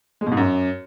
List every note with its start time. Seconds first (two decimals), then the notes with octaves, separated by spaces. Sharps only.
0.21 G#3
0.26 B2
0.32 G#2
0.37 F#2